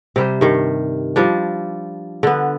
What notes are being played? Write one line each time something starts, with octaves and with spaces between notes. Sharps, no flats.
C3 G3 C5
G2 D#3
F3 G3 D4
D3 B3